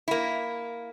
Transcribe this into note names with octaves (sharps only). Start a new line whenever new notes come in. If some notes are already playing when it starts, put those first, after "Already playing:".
A#3 E4